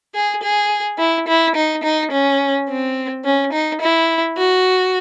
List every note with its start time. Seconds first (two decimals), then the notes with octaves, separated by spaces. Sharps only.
0.15 G#4
0.43 G#4
0.99 E4
1.28 E4
1.56 D#4
1.83 D#4
2.12 C#4
2.69 C4
3.24 C#4
3.53 D#4
3.81 E4
4.38 F#4